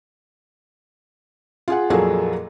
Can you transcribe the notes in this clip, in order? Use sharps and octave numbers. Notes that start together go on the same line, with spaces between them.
F4 G#4 F#5
F2 A#2 F#3 A#3 G#4 A4